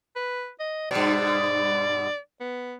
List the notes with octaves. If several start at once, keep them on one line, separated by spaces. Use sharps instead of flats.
B4
D#5
G2 B2 D5
B3